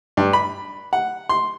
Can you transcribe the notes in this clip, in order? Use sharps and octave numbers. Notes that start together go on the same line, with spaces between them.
G2
B5
F#5
C6